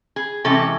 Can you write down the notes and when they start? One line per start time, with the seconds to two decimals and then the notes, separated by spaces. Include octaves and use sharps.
0.16 G#4
0.44 C3 E3 G#3 C#4 A4